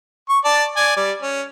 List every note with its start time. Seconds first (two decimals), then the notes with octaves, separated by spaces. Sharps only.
0.29 C#6
0.45 D5 A5
0.76 D5 G#5
0.97 G3 D5
1.22 C#4